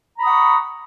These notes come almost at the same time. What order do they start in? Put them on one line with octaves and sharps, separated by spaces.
A#5 B5 D#6 F#5 C#6